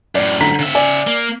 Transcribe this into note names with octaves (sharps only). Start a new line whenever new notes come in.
F#2 A2 D5
D3 A#5 B6
C#3 E5
D5 G#5
A#3